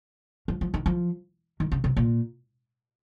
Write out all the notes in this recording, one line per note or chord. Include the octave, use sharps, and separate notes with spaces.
F3
F3
D#3
F3
D#3
C#3
C3
A#2